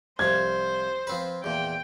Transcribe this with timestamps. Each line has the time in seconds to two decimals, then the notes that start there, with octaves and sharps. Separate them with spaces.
0.19 C2 F3 C5 G#6
1.07 F3 C4 B4
1.44 E2 A#2 G5